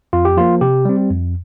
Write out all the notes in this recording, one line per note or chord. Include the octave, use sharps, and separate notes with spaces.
F2 F4
G4
F3 A#3 F4
C3 G4
G3 C4
F2